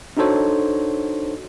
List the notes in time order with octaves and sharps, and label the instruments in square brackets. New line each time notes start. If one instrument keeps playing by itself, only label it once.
[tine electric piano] D4 D#4 F#4 A4 C5 C#5